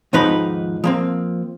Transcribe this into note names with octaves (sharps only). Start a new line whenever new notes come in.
D#2 G#2 F3 D#4 B4 B5
F3 A#3 C4